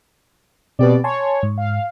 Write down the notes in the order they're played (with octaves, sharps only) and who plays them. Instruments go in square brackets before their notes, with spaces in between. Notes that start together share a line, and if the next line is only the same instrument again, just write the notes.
[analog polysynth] B2 D5 [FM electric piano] C4 G4 B4
[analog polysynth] C#5 [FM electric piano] G#5 A5 C6
[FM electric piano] G#2
[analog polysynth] F5